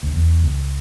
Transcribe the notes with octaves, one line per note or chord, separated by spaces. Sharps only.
D2
E2
C#2